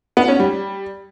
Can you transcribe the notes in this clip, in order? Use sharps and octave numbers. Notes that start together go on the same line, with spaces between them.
B3
C#4
G3